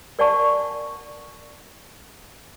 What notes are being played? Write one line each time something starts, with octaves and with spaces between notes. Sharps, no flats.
A#4 D5 F#5 G#5 A5 C#6